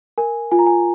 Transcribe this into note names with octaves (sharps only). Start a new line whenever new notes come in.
A#4 G#5
F4 G#5
A#5
G#5